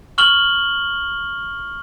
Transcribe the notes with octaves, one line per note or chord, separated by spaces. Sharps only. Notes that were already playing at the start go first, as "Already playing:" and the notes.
C#6 F6 F#7 G7